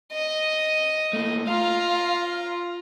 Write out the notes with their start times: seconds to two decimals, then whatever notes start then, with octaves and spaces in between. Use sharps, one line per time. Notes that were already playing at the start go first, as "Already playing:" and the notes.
0.12 D#5
1.14 A#2 A3
1.48 F4 F5 A#5